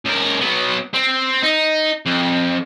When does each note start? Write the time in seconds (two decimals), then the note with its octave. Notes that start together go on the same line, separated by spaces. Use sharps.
0.05 C#2 A#4
0.41 F#3 B3
0.94 C4
1.43 D#4
2.06 F2